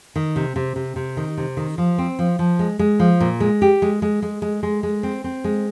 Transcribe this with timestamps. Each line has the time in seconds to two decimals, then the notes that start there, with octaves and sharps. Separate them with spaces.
0.16 D#3
0.36 C3
0.56 C3
0.76 C3
0.96 C3
1.17 D#3
1.38 C3
1.57 D#3
1.78 F3
1.98 C4
2.19 F3
2.39 F3
2.59 G#3
2.79 G#3
3.00 F3
3.20 A#2
3.40 G#3
3.62 G4
3.82 G#3
4.02 G#3
4.22 G#3
4.42 G#3
4.63 G#3
4.83 G#3
5.03 C4
5.24 C4
5.44 G#3